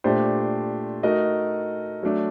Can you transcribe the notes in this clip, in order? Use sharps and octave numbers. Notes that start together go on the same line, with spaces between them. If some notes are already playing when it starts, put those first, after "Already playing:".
A#2 A3 D4 G4 C5
A3 D#4 F#4 A#4 D#5
F#3 A3 D4